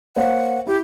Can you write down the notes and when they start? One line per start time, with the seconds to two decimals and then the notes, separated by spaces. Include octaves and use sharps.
0.16 A#3 C5 C#5 F#5
0.67 E4 G4